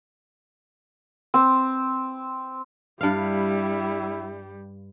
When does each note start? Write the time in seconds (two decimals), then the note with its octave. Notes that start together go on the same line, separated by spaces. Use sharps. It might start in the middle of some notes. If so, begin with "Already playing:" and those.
1.34 C4
3.01 G2 G3 E4 F5